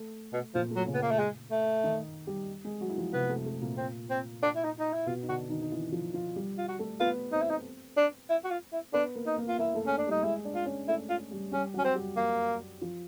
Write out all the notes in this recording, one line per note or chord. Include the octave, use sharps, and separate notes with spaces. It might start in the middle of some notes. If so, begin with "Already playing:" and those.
Already playing: A3
B2
A#2 F3 A#3
A3
F#3
C#3 C#4
B3
A#3
A3
G#3
A3
D#3 D#4
G3 G4
G#3 G#4
F#3 F#4
E4
F3 F4
C3 B3 C4
A3
A3
A#2 A#3
C4
C4
D4
E4
D#4
D#4
E4
B2 B3 F4
D#4
D3 D4 F#4
D#3 D#4
D#4
E3 E4
F3 F4
F3 F4
G3 G4
F4
F#4
A3 A4
B3 F4 B4
C4 D#4 C5
E4
D#4
D4
E4
F#4
F4
E4
B3 D4 B4
A#3 A#4
D#4
A#3 A#4
F4
A#3 E4 A#4
A3 A4
C#4
D4
G3 D#4 G4
G#3 E4 G#4
D4 D5
F4
C#4 C#5
A3 E4 A4
F4
G3 G4
G3 C#4 G4
F#3 C#4 F#4
C4
G3 G4
F#3 A#3 F#4
F3 F4